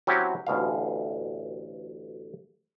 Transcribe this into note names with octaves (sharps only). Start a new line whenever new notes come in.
F#3 C4 C#4 E4 F#4 G4
A1 D2 B2 F5